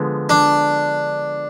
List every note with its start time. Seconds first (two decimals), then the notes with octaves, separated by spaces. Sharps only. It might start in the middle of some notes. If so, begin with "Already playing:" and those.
Already playing: D3 F3 G#3 B3
0.29 D4